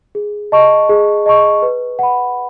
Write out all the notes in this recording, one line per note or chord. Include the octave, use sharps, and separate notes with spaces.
G#4
D#5 A5 C#6
G#4
D#5 A5 C#6
B4
F#5 B5